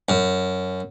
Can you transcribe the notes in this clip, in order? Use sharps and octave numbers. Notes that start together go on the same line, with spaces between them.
F#2